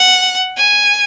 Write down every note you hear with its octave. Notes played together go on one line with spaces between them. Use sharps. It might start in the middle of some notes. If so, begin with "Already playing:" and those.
Already playing: F#5
G#5